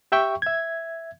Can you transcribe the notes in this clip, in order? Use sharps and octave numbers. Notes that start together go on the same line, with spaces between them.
G4 E5 G5 C#6
E5 G#6